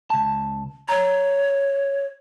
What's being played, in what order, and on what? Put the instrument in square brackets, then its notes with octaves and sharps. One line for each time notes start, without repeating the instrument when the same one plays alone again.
[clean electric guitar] C#2 A5
[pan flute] C#5 [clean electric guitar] A#5